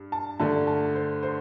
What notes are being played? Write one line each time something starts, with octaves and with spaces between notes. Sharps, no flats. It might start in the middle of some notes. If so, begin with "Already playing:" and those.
Already playing: G2
A5
G2 D3 A3 D4 A5
A5
C5
C5